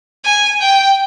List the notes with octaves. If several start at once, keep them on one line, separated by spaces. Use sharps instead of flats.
G#5
G5